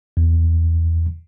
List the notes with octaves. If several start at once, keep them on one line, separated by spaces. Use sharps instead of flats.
E2